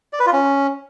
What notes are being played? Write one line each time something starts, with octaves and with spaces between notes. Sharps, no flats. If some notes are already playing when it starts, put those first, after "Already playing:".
D5
B4
F4
C#4